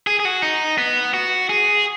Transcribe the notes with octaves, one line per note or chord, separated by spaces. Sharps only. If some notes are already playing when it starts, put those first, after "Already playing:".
G#4
G#4
F#4
D#4
B3
F#4
G#4